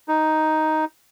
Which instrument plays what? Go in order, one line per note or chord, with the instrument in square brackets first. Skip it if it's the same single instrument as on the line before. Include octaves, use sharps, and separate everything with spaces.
[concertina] D#4